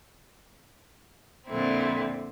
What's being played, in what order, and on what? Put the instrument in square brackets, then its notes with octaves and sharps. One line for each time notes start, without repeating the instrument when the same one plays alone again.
[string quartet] F2 A#2 D3 C4 E4